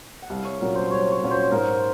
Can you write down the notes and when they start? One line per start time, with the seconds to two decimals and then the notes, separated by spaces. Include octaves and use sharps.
0.22 F#5
0.30 C2 F5
0.45 C#5
0.61 A#2 F#3 C#4 A#4
0.75 C5
0.91 C2 C#5
1.12 C#5
1.21 A#2 F#3 C#4
1.31 C5
1.52 G#2 A#4